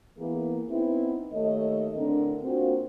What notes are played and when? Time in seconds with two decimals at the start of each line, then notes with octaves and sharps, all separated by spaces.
0.17 E3 A#3 B3 E4 G#4
0.69 B3 C4 D#4 E4
1.32 D#2 A3 A4 C#5 D#5
1.94 A2 D3 C4 D4 A#4
2.42 A#3 C4 D4 F4 F#4 C5